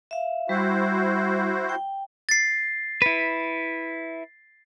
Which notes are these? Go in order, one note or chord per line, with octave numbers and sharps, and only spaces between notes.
E5 F5
G3 E4 F#4 C5
G5
A6 C7
E4 B4